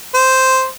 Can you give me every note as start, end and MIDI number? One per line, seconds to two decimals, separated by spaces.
0.15 0.67 72